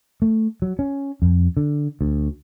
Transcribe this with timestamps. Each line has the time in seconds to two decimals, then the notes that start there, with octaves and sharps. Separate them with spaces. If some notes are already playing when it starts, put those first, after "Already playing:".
0.22 A3
0.62 F#3
0.79 C#4
1.22 F2
1.57 D3
2.01 D2